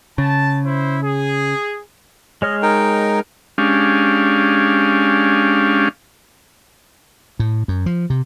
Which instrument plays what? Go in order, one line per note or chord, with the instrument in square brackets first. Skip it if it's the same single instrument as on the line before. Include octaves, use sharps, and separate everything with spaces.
[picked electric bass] C#3 [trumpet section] A5
[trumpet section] E4 C5
G#4
[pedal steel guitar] G#3 C#5 F6 [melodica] D#5
[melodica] D#4 A#4 G5
[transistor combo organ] G#3 C#4 D4 G4 F5
[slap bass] A2
F#2
F3
C3